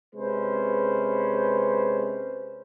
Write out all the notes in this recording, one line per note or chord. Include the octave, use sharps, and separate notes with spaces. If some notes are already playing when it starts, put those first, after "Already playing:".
C3 G#3 C#4 B4 C5